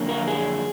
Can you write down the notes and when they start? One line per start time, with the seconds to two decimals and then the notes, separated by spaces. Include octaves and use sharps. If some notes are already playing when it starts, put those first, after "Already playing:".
Already playing: F2 D3 F#3 A#3
0.09 A#4
0.28 G#4